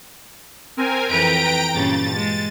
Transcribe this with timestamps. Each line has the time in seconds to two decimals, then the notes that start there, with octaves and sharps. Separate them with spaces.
0.77 C4 A#4 G#5
1.09 F2 E3 B4 G5 A#5 D7
1.74 G2 A#2 C#3 A6
2.15 G#3